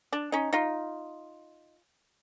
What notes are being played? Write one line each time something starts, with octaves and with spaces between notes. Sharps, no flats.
D4
C#4 D#4
D#4 F4